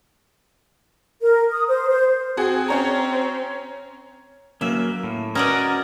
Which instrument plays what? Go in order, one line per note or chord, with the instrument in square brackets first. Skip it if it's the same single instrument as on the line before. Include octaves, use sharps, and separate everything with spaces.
[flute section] A#4
D#6
C5
C5
[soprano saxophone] C4 [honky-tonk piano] F#4 G#4
[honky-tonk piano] C#4 C#5 A#5
[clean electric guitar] F#3 A#3 C#4 [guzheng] E5
[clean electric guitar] A2
[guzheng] C#4 F#4 D5 [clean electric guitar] A#4 D#5 G#5